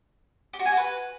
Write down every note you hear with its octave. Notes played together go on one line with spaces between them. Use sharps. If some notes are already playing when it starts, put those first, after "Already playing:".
G4
F#4
G#5
F#4
B4